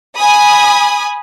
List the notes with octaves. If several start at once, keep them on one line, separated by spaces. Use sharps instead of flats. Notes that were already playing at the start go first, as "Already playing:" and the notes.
G#5 B5 D#6